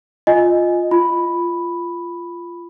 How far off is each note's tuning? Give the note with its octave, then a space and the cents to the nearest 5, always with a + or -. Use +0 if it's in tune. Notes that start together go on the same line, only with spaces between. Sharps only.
F4 +10 D#5 +0 G#5 +0
F4 -10 B5 +0